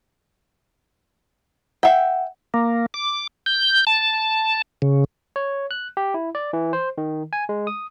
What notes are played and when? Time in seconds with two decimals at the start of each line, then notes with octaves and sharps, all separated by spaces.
1.83 E5 F#5 G5
2.54 A#3
2.94 D6
3.46 G6
3.87 A5
4.82 C#3
5.36 C#5
5.71 F#6
5.97 G4
6.14 E4
6.35 D5
6.53 E3
6.73 C5
6.98 D#3
7.33 G#5
7.49 G#3
7.67 D#6